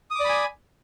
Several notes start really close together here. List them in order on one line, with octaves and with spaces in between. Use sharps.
D#6 D6 D5 B5 G#5